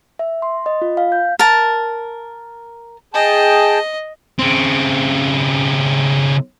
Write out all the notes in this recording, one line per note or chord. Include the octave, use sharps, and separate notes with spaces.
E5
C6
D#5
F4
F5
G6
A#4 A5
G#4 D#5 G5 A5
C#3 C4